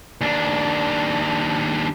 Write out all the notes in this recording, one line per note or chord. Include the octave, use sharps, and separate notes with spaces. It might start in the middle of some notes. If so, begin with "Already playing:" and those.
D#2 D4